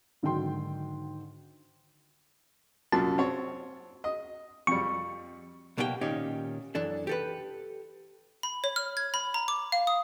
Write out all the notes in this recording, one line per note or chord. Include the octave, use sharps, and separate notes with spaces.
G#2 D3 D#3 F#3 G5 C6
C2 F#2 A#2 A5
C4 C#5
D#5
F2 G3 C#6
B1 B2 A#3 G4 G#4 G5
A#2 D#3 C#4 D#4 G4
F#2 E3 D4 A4
G4 A4 B4
B5
C#5
F6
G#6
B5
A#5
D6
F5
D#6